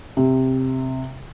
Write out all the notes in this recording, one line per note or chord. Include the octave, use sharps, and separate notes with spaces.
C3